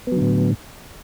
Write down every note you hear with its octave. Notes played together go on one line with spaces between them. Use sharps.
A2 D3 F#3 B3